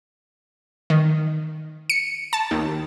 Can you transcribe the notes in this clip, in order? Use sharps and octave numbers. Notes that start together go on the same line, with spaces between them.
D#3
C#7
A5
D#2